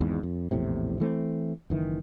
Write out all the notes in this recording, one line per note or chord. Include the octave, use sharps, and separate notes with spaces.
G#1 E2 G#2
F2
A#1 E2 A2 C3
E3 A3 C4
F#1 D#3 E3